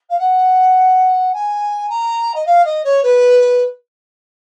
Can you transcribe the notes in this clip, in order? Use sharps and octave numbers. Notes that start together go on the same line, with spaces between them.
F5
F#5
G#5
A#5
D#5
F5
D#5
C#5
B4